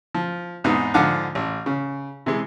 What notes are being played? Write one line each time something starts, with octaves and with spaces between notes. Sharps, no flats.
F3
E2 G#2 C3 B3 D#4
G#2 D3 F3 F5 F#5 D6
A1
C#3
C3 E3 G#3